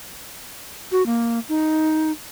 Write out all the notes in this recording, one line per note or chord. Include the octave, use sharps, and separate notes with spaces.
F#4
A#3
D#4